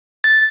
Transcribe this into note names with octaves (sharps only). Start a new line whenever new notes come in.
A6